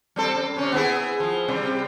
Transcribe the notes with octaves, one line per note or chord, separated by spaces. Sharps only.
G3 C4 A4
F#2
C3 C#4
B3 E4 G#4
F3
C3 G3 C4